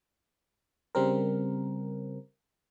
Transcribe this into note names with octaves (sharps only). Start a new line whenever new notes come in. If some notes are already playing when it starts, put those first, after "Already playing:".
C#3 G3 C4 A#4